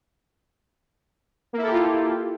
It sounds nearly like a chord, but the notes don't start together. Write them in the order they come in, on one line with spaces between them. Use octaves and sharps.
A#3 E4 A4 G4 F4